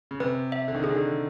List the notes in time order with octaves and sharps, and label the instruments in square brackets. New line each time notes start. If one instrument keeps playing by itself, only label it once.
[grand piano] C#3
[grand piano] C3 [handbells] B4
[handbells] E5
[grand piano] D3
D#3
[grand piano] D3 [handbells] G#4
[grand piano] D#3
D3